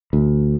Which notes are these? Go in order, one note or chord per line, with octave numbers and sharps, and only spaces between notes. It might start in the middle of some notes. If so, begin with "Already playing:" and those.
D2